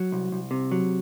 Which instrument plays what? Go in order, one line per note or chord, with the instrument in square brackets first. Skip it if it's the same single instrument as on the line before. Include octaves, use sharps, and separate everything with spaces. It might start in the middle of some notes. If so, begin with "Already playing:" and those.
Already playing: [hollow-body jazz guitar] F#3
C2
C2
C3
F#3